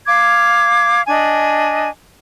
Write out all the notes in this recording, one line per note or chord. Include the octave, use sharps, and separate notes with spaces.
F5 D6 G#6
D4 D#5 G#5